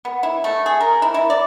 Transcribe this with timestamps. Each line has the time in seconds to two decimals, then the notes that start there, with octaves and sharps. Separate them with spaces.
0.05 B3
0.23 E4
0.44 A3
0.66 G#4
0.81 A#4
1.02 E4
1.14 E4
1.30 D5